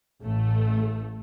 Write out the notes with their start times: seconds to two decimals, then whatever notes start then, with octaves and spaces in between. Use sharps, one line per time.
0.21 A1 A3